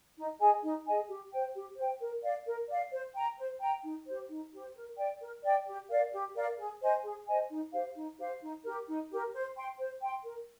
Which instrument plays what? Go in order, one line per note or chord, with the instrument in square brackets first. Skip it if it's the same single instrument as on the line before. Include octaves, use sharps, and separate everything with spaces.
[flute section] D#4
G#4 D#5 G#5
D#4
G#4 D#5 G#5
G4
C5 G5
G4
C5 G5
A#4
D5 F5
A#4
D5 F5
C5
G5 A#5
C5
G5 A#5
D#4
G4 C5
D#4
G4 C5
A#4
D5 G5
A#4
D5 G5
G4
A#4 D5 F5
G4
A#4 D5 F5
G#4
C5 D#5 G#5
G#4
C5 D#5 G#5
D#4
G4 C5 F5
D#4
G4 C5 F5
D#4
G4 A#4
D#4
G4 A#4
C5
G5 C6
C5
G5 C6
A#4